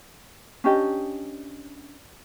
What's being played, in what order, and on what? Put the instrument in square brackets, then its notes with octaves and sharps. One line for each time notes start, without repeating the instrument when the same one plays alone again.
[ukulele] C#4 D4 G4 D#5